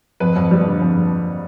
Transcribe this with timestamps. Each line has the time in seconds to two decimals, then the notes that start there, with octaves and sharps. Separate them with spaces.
0.20 F2 B4
0.36 F2
0.51 G3
0.67 D3
0.82 F2